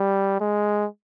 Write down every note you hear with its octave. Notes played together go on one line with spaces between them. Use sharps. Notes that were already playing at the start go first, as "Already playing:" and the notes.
Already playing: G3
G#3